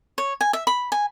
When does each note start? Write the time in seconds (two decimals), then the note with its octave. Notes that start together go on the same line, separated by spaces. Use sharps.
0.18 C#5
0.41 G#5
0.53 E5
0.67 B5
0.92 G#5